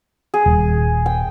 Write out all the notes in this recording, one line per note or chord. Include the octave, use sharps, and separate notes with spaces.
G#4
D#1
G5